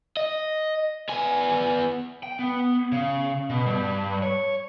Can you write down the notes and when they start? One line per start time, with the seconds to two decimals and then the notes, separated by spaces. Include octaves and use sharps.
0.17 D#5
1.09 B3 G#5
2.23 G5
2.39 B3
2.92 C#3
3.50 B2
3.66 G2
4.22 C#5